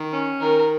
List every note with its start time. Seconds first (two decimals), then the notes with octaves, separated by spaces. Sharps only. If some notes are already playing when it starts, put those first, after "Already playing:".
Already playing: D#3
0.11 C#4
0.41 D#3 A#4